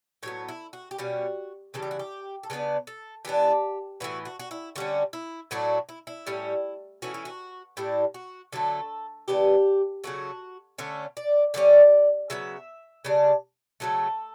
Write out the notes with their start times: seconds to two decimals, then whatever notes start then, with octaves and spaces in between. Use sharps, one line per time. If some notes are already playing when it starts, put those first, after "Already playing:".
0.23 A2 F#3 B3 C#5
0.48 E4
0.73 F#4
0.91 G4
0.98 B2 G3 C#4 F#4
1.74 C#3 E3 G3 A4
1.82 G4
1.91 F#4
1.99 G4
2.43 A4
2.50 C#3 G3 B3 D4 B4
2.87 A4
3.25 E3 B3 D4 G4
4.00 A2 E3 B3 F#4
4.25 F#4
4.39 F#4
4.51 E4
4.76 D3 G3 C#4 F#4
5.13 E4
5.51 A2 F#3 A3 D4 F#4
5.89 E4
6.07 E4
6.27 A2 G3 C#4
7.02 E3 A3 C#4 F#4
7.14 E4
7.25 F#4
7.77 A2 G3 D4 E4
8.14 F#4
8.52 D3 F#3 A3 A4
9.28 C#3 E3 B3 D4 G4
10.04 C#3 F#3 A3 F#4
10.78 D3 A3 C#4 C#5
11.17 D5
11.54 D3 G3 C#4 D5
12.30 C#3 F#3 B3 E5
13.05 C#3 G3 D4
13.80 C#3 F#3 A3 A4